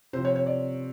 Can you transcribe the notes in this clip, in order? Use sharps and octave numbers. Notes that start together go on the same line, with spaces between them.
C3 F3 C5
C#5
C#5
D5